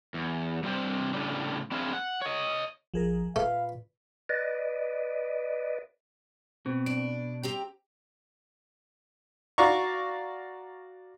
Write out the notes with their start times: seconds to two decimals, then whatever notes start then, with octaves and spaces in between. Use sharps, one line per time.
0.14 E2
0.63 G2 C3 G3 C4 C5
1.14 A2 C#3 G3 D4
1.72 C4 D4 E4 G#4 F5
1.93 F#5
2.21 C#5 D#5
2.94 A#1 F3 G#4 A#4
3.36 A#2 A3 B4 F5
4.29 B4 D5 D#5
6.66 B2 C4
6.86 D4 D7
7.43 C4 G4 A#5
9.58 F#4 D5 F5 A#5 C#6